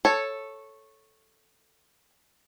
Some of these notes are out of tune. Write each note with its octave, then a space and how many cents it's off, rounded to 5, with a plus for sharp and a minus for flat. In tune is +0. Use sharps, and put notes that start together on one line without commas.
A4 +0 C#5 -10